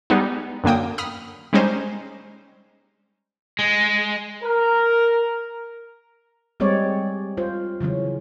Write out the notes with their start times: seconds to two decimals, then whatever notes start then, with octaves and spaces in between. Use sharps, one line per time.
0.10 G3 G#3 B3 D#4
0.64 F#2 D3 A#3 G5 D#6
0.98 B5 D#6 F6
1.53 G3 G#3 C#4 D#4 C5
3.59 G#3
4.43 A#4
6.60 G3 G#3 C4 C#5 D5
7.37 F4 C5
7.81 C#3 E3 F#3 C#4